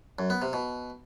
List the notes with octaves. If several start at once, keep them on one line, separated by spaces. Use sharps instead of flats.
F#2
B3
C3
B2